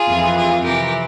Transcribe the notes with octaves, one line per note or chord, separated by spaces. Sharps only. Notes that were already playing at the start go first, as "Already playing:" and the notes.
Already playing: F4 G#4
F2 E3
F4 G#4
F2 C3 E3 G4 A#4